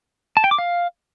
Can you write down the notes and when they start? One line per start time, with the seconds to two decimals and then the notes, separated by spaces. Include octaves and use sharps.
0.37 A5
0.44 G5
0.51 D6
0.58 F5